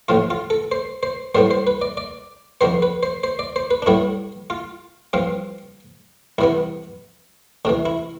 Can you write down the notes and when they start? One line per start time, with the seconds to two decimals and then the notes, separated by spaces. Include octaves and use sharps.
0.08 A1 A2 F3 F4
0.30 F4
0.50 A4
0.72 C5
1.03 C5
1.35 B1 A2 G3 B3 C5
1.51 C5
1.67 B4
1.82 D5
1.97 D5
2.61 F2 D3 F3 B3 C5
2.82 B4
3.03 C5
3.24 C5
3.39 D5
3.56 C5
3.71 B4
3.82 D4
3.86 B1 A2 G3 B3 E4
4.50 F4
5.13 G2 F3 C4 F4
6.38 C2 C3 E3 B3 E4
7.65 D2 C3 E3 D4
7.85 E4